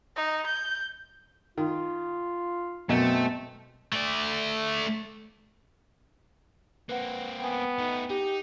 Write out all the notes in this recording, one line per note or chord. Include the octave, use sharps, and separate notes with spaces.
D#4
G6
D#3 F4
F#2 B2 A3 C4
A3 D5
A#3 C4 B4 F#5
B3 G5 G#5
A3 D#4
D#4 G4